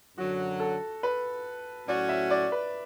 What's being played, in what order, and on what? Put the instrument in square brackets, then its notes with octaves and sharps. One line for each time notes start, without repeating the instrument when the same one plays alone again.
[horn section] F#2 D3 F#3 [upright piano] F#4
[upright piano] A4
B4
[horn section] A2 F#3 C#4 F#4 [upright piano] D5
[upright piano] E5
D5
B4